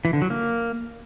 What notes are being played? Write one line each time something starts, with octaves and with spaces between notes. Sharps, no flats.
E3
D3
F#3
A#3